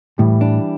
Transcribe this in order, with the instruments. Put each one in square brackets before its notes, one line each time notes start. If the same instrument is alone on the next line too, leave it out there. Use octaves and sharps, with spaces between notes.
[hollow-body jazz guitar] A2 [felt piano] E3 G3
[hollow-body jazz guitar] D4